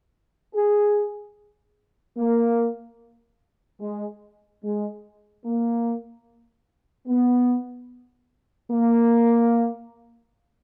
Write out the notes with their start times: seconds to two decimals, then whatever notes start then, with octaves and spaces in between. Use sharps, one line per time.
0.55 G#4
2.18 A#3
3.81 G#3
4.64 G#3
5.45 A#3
7.08 B3
8.71 A#3